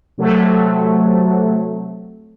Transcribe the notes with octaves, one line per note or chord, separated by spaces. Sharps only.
C3 F#3 A3